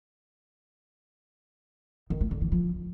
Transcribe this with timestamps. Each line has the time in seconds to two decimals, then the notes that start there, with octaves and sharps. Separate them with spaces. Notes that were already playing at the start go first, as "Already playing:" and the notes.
2.10 D#3
2.21 A3
2.31 D3
2.41 E3
2.52 F3